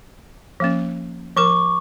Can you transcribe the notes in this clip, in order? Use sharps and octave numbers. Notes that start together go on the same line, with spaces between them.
F3 A#3 C#4
F3 A#4 C#6 D6